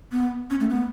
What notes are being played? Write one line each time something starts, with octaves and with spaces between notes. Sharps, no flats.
B3
C#4
A3
B3